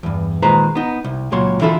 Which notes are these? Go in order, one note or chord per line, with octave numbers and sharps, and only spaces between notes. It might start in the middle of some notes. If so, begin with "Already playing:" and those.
E2 G2
A#2 D#3 G#3 B4 C5 A#5
B3 D#4
C2
C#2 A#2 F#3 C#5 C6
D3 E3 E4 F4 A4